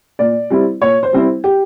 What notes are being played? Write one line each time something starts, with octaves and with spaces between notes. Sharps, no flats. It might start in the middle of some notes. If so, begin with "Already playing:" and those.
A#2 D5
G3 C4 E4
A#2 C#5
C5
G3 C4 E4
G4